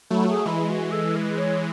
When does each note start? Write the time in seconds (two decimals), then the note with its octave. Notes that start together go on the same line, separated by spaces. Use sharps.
0.11 F#3 A3 E4
0.24 F#4
0.29 G#4
0.46 E3 G#3 E4
0.69 F#4
0.91 A4
1.15 B4
1.37 C#5